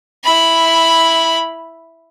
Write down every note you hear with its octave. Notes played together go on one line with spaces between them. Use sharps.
E4 B5